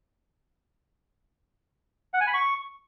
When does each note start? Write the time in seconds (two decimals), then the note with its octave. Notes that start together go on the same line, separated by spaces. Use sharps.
2.14 F#5
2.20 G#5
2.27 B5
2.34 C#6